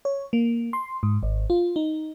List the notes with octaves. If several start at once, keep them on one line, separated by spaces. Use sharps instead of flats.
C#5
A#3
C6
G#2
G#1
F4
D#4